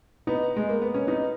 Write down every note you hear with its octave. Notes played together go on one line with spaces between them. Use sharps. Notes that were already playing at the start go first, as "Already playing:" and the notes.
B3 D#4
G#3
A#3
B3
C#4
B3 D#4